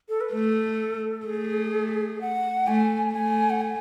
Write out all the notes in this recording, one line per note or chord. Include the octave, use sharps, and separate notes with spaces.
A4
B4
A3 A4
A3 G#4
F#5
A3 G#5
A3 G#5
F#5
G#5